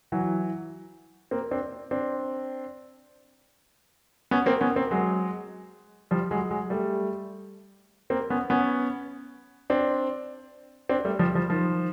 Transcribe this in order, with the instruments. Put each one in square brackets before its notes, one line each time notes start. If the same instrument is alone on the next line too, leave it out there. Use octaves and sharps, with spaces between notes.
[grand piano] E3 F#3
A#3 C4
C4 D4
C4 D4
B3 C#4
A#3 C4
B3 C#4
A#3 C4
F#3 G#3
F3 G3
F#3 G#3
F#3 G#3
G3 A3
A#3 C4
B3 C#4
B3 C#4
C4 D4
C4 D4
G3 A3
F3 G3
F3 G3
D#3 F3